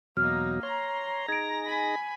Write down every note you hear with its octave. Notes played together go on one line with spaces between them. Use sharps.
E2 B2 F#3 A#3 D#4 F6
C#5 A#5 C6
D#4 G#4 G#6 A#6 D7
G#5 B5